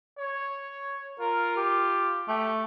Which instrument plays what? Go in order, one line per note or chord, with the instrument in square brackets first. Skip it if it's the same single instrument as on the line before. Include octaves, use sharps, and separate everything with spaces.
[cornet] C#5
[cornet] F4 [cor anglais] A#4
[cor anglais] G4
[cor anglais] A3 [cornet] G4